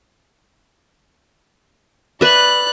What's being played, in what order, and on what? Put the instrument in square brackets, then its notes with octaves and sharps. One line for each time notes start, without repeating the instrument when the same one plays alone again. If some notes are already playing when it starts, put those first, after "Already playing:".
[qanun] B4 E5 [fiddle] D5 F#6